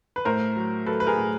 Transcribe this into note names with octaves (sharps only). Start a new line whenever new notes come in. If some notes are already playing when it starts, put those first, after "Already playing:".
B4
A2 A#4 C5
F#3
F#3 A4 B4
B4
G#4 A#4
A2